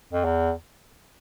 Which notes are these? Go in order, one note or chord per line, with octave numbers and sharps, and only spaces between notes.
F2
E2